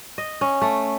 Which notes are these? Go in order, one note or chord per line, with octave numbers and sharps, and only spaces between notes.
D#5
C#4
A3